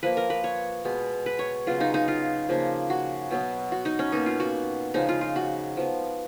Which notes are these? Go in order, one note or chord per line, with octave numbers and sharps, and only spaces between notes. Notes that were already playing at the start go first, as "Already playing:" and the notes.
F3 A#3 B4
A#4
B4
C#5
B2 G#3 B3
B4
C#5
C#3 F#3 B3 F4
D#4
D#4
F4
C#3 F3 A#3
F#4
B2 F#3 B3
F#4
D#4
C#4
B2 A#3 D#4
F4
F#4
C#3 F3 G#3 D#4
F4
F4
F#4
F3 B3